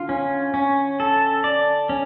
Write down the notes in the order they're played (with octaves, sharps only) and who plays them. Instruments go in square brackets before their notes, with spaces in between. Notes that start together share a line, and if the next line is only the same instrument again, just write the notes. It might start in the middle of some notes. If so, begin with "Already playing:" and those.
Already playing: [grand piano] D3 [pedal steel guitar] F4
[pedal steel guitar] C#4
C#4
A4
D5
C#4